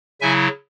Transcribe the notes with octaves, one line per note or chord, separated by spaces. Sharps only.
C#3 F#3 E4 E5 G#5